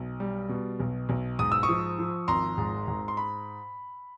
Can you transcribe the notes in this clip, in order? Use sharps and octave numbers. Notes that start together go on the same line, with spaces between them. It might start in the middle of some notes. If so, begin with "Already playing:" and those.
Already playing: B1
G3
B2
B1
B1
G#2 D#6
E6
C#6 D#6
F3
F3
G#1 A#5 C6
G#2
G#2
C6
B5